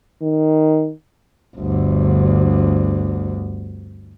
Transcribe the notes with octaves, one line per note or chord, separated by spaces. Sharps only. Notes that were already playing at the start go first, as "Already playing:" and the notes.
D#3
G1 D2